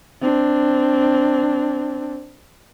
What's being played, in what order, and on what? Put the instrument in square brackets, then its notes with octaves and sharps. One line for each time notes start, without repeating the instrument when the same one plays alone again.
[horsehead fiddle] C4 D4